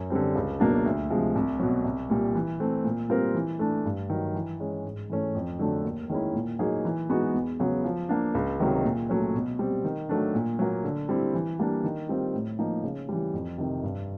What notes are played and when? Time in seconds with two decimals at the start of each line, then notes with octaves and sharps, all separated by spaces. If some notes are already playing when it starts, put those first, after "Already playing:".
Already playing: F#2
0.10 D3 G3 C4
0.35 C#2
0.60 B2 F#3 A#3 D4
0.86 D2
1.10 C3 F3 G#3
1.35 C2
1.60 B2 F#3
1.84 C2
2.10 A#2 G3
2.35 E3
2.60 A3 C4
2.84 A#2
3.10 G3 C4 F4 A#4
3.35 E3
3.59 A3 D4
3.85 G2
4.10 D#3 F#3
4.34 E3
4.60 G#3 C#4
4.85 G#2
5.10 E3 A3 C#4
5.35 F2
5.59 D3 F#3 A3 D4
5.84 D#2
6.09 D#3 G#3 C#4 E4
6.35 A#2
6.59 F#3 A#3 D#4 G#4
6.85 E3
7.10 G#3 B3 D#4 F#4
7.34 E2
7.60 C#3 F#3 B3
7.84 F3
8.09 A#3 D4
8.35 C#2
8.60 C3 D#3 F#3
8.84 A#2
9.09 F#3 A3 C#4
9.34 B2
9.59 G3 C4
9.85 D#3
10.09 F#3 A3 D4
10.34 A#2
10.59 F#3 A#3
10.84 D3
11.09 G3 C4 E4
11.34 E3
11.59 G3 A#3 D4
11.84 D#3
12.09 G3 C4 F4
12.34 A2
12.59 F3 A#3 D#4
12.84 C#3
13.09 E3 G3
13.33 F2
13.58 C3 D#3
13.83 G2